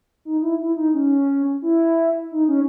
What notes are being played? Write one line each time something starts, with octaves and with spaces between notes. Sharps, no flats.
D#4
E4
E4
D#4
C#4
E4
D#4
C#4